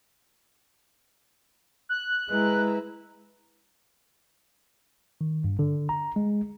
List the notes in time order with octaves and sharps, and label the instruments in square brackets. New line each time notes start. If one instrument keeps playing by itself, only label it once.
[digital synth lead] F#6
[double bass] G#3 [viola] E4 A#5 [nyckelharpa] B4
[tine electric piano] D#3
G2
D3
A#5
G#3